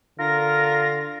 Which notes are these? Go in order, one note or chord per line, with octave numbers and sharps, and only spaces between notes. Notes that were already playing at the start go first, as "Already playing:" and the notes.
D3 F4 A#4 A#6